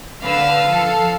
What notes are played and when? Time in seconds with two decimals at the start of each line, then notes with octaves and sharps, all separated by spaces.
0.22 D3 B4 F5 E6
0.68 F3 A4